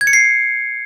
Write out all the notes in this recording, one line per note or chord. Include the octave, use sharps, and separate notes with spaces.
G#6
C#7
C7